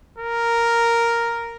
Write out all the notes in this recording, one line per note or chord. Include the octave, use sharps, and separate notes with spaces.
A#4